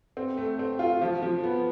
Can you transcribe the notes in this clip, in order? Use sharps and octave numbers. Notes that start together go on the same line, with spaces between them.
C4
A3
C4
F4
F3
F3
B3